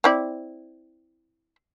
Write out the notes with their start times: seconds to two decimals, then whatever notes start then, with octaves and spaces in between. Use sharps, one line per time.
0.04 C4 E4 D5